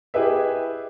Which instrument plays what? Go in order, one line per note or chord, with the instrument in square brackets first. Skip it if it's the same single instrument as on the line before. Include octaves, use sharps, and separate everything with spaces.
[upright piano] E4 G4 G#4 B4 D#5 E5